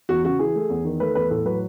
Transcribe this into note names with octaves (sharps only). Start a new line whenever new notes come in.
E2 F#4
C#3 F#4
E3 G#4
A3
E2
D#3
A3 B4
E2 B4
A2 A4
F#3 B4